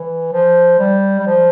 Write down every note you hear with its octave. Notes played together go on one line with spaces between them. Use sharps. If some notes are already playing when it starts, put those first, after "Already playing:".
Already playing: E3
F3
G3
G3
F3